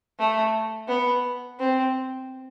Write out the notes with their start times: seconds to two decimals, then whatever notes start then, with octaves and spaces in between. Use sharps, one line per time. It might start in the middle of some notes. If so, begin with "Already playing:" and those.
0.19 A3
0.88 B3
1.59 C4